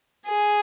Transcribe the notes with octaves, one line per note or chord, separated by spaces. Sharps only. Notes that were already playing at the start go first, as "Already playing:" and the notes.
G#4